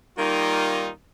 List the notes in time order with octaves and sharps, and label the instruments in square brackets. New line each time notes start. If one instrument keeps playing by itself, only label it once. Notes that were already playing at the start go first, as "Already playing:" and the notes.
[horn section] D#3 G3 A#3 D#4 F4